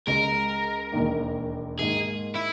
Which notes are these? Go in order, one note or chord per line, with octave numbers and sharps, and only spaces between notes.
C#2 C#3 G#3 A#4
E1 D#2 D#3 A#3
G#2 D#3 A#3 G#4
E4